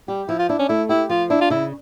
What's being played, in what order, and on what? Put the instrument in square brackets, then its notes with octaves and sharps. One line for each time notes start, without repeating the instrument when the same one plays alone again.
[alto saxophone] G3 [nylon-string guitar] G4
[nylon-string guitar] F3 [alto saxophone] E4
[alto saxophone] F4
[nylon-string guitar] D4 [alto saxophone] E4
[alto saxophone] C#4
[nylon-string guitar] A3 [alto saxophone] E4
[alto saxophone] E4 [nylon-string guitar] G4
[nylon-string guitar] F3 [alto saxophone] F4
[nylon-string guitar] D4 [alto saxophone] E4
[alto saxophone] F4
[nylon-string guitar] C#3 [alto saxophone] E4